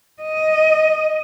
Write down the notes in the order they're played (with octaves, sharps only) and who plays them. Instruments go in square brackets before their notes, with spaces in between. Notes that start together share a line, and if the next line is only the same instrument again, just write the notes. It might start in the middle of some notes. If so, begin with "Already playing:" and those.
[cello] D#5